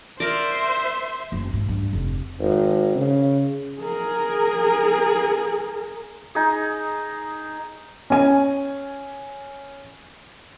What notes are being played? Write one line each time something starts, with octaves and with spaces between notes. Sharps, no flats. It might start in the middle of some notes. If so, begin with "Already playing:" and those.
A#4 C5 D5 E5
F#1
G#2
G2
F1
G#1
C#3
G#4 A#4
D#4 G#4
C#4 G#5